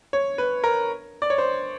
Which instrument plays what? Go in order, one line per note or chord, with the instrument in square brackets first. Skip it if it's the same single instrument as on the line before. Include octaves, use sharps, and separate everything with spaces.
[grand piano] C#5
B4
A#4
D5
C#5
C5